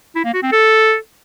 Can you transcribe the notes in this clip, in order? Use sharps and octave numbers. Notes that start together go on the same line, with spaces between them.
E4
A#3
F#4
C4
A4